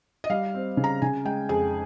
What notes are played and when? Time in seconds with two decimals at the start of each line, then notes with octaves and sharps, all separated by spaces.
0.24 D#5
0.30 G3 F5
0.55 C4
0.77 C#3
0.84 A#5
1.02 C#3 G#5
1.25 G#3 G5
1.49 F2 G#4